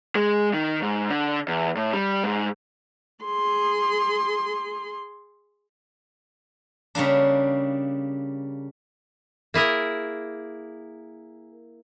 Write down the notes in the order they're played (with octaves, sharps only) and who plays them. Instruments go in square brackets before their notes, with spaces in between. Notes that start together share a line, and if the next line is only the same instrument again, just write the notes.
[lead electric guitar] G#3
D#3
G#2
D3
E2
A2
G3
G#2
[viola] G#4 C6
[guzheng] C#3 G3 A#3 D4
[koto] A#3 E4 G#4 A#4